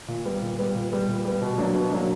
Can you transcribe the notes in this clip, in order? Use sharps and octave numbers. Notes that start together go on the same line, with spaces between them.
A#2
G3 B3
A#2
G3 B3
A#2
G3 B3
A#2
G3 B3
B2
F#3 A#3 D4
B2
F#3 A#3 D4